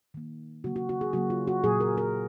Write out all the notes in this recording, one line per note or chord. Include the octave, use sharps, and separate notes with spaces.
D#3 A#3
C#3 F#3 A#3 F#4
F#4
F#4
G#4
C#3 F#3 A#3 F#4
F4
F#4
A#2 F#3 A#3 G#4
A#4
A#4